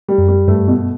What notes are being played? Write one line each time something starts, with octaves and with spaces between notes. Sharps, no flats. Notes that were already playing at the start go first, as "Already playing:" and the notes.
G3
F#2
G3
G2 A3
B2